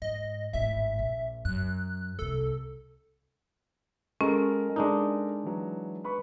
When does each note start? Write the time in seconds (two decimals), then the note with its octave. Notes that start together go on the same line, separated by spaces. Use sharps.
0.02 G#2 D#5
0.53 G#1 A2 E5
0.99 A#1
1.45 F#2 F#6
2.19 C2 C3 A4
4.21 G#3 C#4 F#4 A4 A#4
4.76 G#3 D4 D#4
5.44 E3 F#3
6.04 B4 B5 C#6